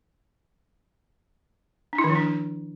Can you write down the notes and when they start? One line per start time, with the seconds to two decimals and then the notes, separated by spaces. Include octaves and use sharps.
1.93 D4
1.98 E4
2.04 D#3
2.10 F3
2.15 D4